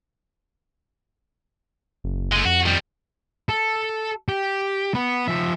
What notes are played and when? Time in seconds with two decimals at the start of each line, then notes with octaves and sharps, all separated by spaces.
2.04 F#1
2.32 G#3 A3
2.46 F2 F#4
2.66 D#3 G3
3.49 A4
4.29 G4
4.94 B3
5.28 F3 E5